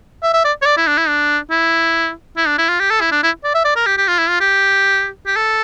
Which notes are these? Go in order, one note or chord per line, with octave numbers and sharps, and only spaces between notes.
E5
E5
D5
C#5
D5
E4
D4
E4
D4
E4
E4
D4
E4
F4
G4
A4
E4
D4
E4
D5
E5
D5
A#4
G4
G4
F4
E4
F4
G4
G4
A4